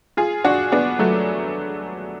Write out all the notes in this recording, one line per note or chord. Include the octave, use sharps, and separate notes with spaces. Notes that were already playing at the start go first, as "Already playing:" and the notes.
F4 G#4
D4 F#4
B3 D4
F#3 A3